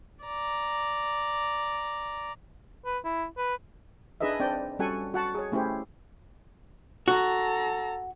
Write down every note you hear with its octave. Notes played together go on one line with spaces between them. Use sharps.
D5 A#5
B4
E4
B4
D4 D#4 G#4 B4 D#5 E5
C4 D4 D5 G5
G3 C#4 F#4 A4 F#5 G#5
F#4 F#5 A5
G#4 C#5
A3 C#4 E4 G4 C5
F#4 A4 A#5